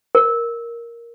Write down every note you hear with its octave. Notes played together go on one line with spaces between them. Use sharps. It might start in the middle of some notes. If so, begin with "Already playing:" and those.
A#4